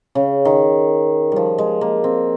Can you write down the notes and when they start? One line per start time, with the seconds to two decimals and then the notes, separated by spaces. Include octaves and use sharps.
0.15 C#3
0.45 D#3
1.32 F3 G3
1.58 G#3
1.81 A#3
2.04 C4